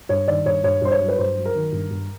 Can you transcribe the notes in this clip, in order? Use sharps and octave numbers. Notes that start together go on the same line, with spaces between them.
G2 C#5
D#3 D5
G2 C#5
G2 C#5
G2 C5
C#5
F#3
B4
G2 C5
F#3
A#4
D#3
G2
G2